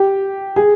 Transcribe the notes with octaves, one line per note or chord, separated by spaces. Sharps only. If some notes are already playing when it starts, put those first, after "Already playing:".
Already playing: G4
G#4